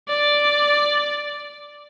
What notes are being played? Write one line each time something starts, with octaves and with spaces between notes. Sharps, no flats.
D5